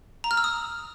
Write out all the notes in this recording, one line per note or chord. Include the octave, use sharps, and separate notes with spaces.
A#5
F6
E6
D#6